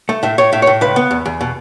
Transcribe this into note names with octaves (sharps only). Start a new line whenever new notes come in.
A3
A2 E5
A2 C#5
A2 E5
C#5
A2
C#2 B4
B3
E2
E2
B2